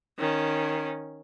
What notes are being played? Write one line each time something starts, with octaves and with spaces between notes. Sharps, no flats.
D#3 C#4